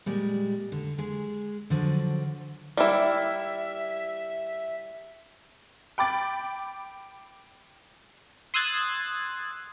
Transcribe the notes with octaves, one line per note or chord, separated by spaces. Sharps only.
A#2 G3 G#3
D3
G#3 G#4
D3 F3 F#3
G3 A#3 E4 E5
G5 B5 D6 A6
C6 D#6 E6 F#6 G#6 A6